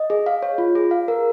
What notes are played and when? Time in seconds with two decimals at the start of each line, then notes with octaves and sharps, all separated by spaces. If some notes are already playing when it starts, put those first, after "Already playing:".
Already playing: D#5
0.10 G#4
0.26 F5
0.43 C#5
0.58 F4
0.75 G#4
0.91 F5
1.08 A#4